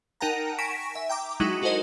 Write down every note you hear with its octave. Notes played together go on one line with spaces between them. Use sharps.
D#4 A#4 F#5 G5 A5 A#5
G#5 C#6 A#6 B6 D7 E7
E5
G5 A#5 D6
F#3 G#3 D#4 E4 F#4
D#4 F#4 A4 A#4 C5 D#5